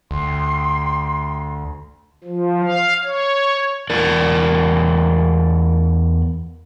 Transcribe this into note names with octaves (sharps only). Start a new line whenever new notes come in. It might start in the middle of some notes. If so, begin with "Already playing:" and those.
D2 G5 C6
F3
F5
C#5
E2 A#4 D5